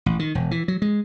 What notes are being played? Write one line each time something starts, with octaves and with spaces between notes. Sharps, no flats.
A1
D#3
E1
E3
F#3
G#3